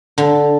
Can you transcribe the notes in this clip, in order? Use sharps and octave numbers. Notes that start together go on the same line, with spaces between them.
D3